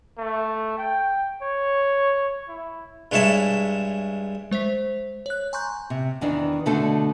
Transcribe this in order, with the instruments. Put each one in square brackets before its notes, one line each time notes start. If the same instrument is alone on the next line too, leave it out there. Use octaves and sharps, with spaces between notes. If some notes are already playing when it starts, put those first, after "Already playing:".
[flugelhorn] A3
G5
C#5
E4
[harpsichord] G2 G#3 E4 C#5 E5 A5
[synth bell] G#3 C5 E5 B6
C#5 F#6
G#5 A#5 C6 C#6 F#6 G6
[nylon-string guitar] C3
E2 D#3 E3 D4
B2 D3 A3 D4 A4